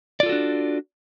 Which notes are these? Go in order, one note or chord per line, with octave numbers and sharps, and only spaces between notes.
D4 F4 F#4 A4 D5